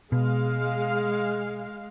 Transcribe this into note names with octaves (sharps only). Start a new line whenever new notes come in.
B2 G#3 F5